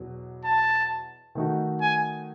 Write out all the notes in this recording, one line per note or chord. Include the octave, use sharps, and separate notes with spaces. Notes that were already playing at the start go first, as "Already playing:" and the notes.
Already playing: E2 B2 F#3
A5
D#3 A3 D#4 F#4
G#5